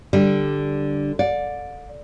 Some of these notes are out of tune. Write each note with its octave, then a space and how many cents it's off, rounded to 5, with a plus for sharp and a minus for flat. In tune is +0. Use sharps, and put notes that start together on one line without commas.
D3 +0 G3 +0
D5 +0 F#5 -45